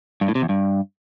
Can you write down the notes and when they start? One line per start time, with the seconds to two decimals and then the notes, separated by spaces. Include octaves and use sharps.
0.21 G2
0.28 A2
0.35 C3
0.42 E2
0.49 G2